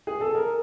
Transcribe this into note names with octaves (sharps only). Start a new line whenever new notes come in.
G#4
A4
A#4